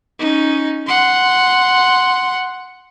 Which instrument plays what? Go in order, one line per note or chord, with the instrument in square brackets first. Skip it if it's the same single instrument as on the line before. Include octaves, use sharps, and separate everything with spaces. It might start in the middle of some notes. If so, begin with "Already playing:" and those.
[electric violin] C#4 D#4
F#5 C6